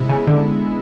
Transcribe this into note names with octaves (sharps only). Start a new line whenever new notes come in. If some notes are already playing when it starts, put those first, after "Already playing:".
Already playing: C3 G#3 B3 E4
C#3
D3